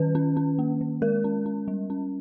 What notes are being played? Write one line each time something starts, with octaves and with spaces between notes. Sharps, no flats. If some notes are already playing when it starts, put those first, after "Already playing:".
Already playing: D#3 C#4 B4
C#4
C#4
A#3
D#3
G#3 A#4
C#4
C#4
G3
C#4